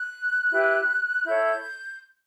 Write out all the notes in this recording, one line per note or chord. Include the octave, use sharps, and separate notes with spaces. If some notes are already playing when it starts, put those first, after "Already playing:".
Already playing: F#6
E4 G4 B4
E4 A4 C#5 G6